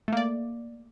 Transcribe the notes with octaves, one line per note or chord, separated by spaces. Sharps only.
A3 A#3 D5